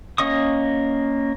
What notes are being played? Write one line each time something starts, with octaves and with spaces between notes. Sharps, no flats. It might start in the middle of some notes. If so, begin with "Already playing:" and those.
A#3 C#4 D#5 C#6 D#6